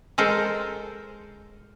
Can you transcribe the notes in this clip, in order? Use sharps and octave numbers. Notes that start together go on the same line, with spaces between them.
G#3 A4 A#4 C5